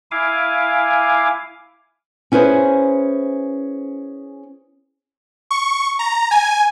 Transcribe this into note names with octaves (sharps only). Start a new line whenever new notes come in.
E4 F5 G#5 D6
C#4 E4 G#4 B4 C5
C#6
A#5
G#5